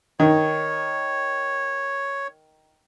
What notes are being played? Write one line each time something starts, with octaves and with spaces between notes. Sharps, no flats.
D#3 C#5